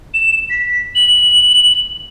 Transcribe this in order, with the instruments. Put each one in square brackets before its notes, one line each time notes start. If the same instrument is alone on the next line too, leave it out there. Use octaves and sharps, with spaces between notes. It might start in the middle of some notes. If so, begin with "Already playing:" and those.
[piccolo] E7
B6
F#7